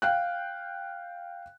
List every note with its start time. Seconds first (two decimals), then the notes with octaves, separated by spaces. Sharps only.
0.02 F5 G5 F#6